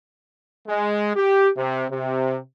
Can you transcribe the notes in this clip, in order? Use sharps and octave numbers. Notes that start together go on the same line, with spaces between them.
G#3
G4
C3
C3